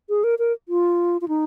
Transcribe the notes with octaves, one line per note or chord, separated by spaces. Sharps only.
G#4
A#4
A#4
F4
F4
D#4